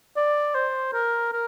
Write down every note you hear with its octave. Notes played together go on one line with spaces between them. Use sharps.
D5
C5
A#4
A#4